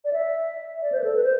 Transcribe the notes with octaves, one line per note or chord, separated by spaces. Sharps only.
D5
E5
D5
C5
B4
A4
B4
C5